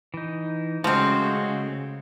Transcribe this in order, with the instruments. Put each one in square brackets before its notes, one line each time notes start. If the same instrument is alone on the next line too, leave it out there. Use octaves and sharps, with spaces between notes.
[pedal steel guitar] E3 D#4
[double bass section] C#3 [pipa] F3 C4 [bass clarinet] G#3 [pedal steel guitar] A3 F#4